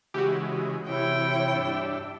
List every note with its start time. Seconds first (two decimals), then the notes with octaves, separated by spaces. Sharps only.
0.14 C#3 E3 G#3 F#4 G4
0.89 C3 E3 E4 C#5 G5
1.55 G2 D4 E5